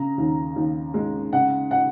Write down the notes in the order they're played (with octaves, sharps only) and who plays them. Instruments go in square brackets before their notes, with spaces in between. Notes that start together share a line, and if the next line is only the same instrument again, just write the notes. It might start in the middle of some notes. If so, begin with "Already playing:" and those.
Already playing: [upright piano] C#3 A#5
D#2
D#2
G#3
C#3 F#5
F#5